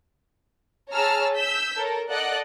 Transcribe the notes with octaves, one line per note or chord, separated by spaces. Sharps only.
G#4 C#5 A5 A#5 E6 F6
E6 G6 B6
A4 A#4 C#5
A4 D5 D#5 F#5 F#6